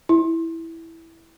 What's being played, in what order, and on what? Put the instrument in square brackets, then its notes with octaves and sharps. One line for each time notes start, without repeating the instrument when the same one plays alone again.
[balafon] E4